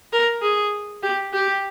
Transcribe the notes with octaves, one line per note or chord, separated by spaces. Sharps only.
A#4
G#4
G4
G4